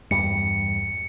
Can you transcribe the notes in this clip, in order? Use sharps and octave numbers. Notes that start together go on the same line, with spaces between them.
E2 G2 G3 C#7